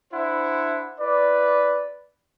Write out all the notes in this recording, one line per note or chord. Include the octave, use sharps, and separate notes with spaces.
D4 E4 C5 F#5
E4 B4 D5